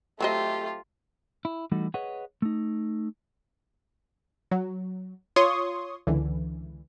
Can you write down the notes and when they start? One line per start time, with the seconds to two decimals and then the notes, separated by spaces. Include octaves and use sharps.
0.20 F#3 A3 C4 F4 G4 D#5
1.45 E4
1.72 E3 G3 A3 D#4 F#4
1.94 G#4 B4 C#5 D#5 F#5
2.42 A3 D#4
4.51 F#3
5.36 F4 C#5 C6 C#6 D#6
6.07 C#2 D3 E3